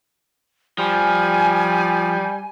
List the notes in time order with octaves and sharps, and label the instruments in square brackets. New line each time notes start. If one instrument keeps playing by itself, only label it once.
[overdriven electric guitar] F3 [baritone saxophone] G3 [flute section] G#5